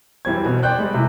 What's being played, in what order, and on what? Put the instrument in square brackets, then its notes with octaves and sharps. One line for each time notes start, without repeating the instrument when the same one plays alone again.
[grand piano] F#2 E3 G3 C4 G#6
B2 C4
C5 D5 G5 F#6 G6
G3 G#3
C3 E3